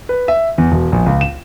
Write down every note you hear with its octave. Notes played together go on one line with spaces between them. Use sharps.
B4
E5
E2
E1
A#1
C#2
E7